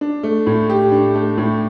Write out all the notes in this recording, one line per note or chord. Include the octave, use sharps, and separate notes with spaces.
D4
A3
A2
G4
D4
A3
A2